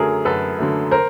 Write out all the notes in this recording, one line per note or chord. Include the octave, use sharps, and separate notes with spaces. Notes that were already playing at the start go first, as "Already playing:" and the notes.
Already playing: F#2 D3 F#3 A3 G#4 A#4
F#2 A4 B4
D3 F#3 A3
A#4 C5